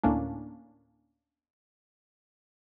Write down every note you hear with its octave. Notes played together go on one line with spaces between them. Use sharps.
D2 A2 A#3 C#4 D4